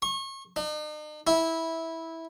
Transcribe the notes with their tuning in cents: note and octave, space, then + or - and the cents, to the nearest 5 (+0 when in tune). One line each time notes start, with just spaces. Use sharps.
C#6 -35
D#4 -45
E4 -15